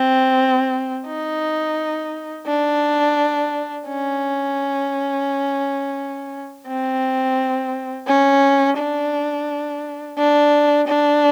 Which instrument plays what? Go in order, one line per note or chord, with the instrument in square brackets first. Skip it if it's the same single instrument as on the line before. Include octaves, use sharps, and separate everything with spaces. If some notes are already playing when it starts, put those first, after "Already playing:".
Already playing: [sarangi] C4
D#4
D4
C#4
C4
C#4
D4
D4
D4